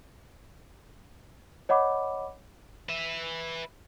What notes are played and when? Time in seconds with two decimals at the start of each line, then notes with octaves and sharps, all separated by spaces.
1.69 C#5 D#5 F#5 B5 D6
2.89 B4 E5